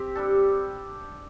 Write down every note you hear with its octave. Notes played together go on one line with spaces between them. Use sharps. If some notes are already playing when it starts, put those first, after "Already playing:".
Already playing: C4 G4
G3 D4 A4